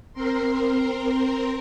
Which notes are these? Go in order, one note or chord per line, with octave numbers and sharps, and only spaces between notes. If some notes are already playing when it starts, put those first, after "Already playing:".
C4 A#4 C6